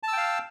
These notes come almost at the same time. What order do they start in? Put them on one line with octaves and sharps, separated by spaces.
A5 E6 G5 F5